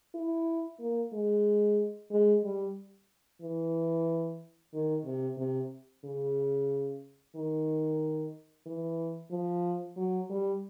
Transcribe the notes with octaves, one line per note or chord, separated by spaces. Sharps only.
E4
A#3
G#3
G#3
G3
E3
D#3
C3
C3
C#3
D#3
E3
F3
F#3
G3